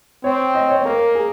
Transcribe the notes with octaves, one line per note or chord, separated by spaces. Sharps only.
C4 C#5
D#5
C#5
A#3 A#4
G#4